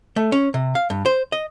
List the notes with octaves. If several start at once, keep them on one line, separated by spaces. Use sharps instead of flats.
A3
C#4
C3
F5
G2
C5
D#5